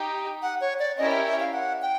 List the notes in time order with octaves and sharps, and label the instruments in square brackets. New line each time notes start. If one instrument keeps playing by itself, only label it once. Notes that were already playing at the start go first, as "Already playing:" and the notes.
Already playing: [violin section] D#4 G4
[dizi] F#5
C#5
D5
[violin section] C#4 E4 G4 A#4 C#5 [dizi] D#5
[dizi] E5
E5
F5
F#5
G5